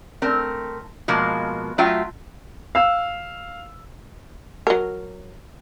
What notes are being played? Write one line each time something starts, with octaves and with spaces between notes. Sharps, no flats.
A3 C4 A#4
B2 F3 G#3 A#3
F#3 A3 F4 E5 G5
F5 E6
F#3 A#4